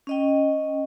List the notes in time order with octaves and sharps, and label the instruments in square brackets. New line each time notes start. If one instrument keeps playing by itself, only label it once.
[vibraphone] C#4 D#5 G5